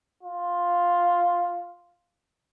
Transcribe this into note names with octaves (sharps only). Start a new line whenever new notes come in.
F4